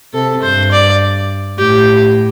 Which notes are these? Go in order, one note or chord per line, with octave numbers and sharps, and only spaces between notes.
C3 A4
G2 C5
D5
A2 G4